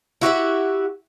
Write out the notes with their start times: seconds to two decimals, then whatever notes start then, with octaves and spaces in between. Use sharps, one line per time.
0.21 E4 F#4 G4 E5